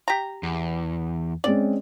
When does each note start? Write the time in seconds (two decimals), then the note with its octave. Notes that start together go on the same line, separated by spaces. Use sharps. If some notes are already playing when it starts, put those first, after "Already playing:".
0.08 G4 A#5
0.43 E2
1.44 G#3 C4 C#4 D5